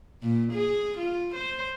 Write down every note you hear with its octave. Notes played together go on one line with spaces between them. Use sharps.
A#2
G#4
F4
C5